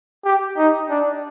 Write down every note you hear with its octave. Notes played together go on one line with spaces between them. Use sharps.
G4
D#4
D4